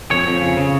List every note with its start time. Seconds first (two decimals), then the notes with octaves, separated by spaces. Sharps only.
0.11 F2 C#5
0.27 F2
0.41 C#3
0.57 C#3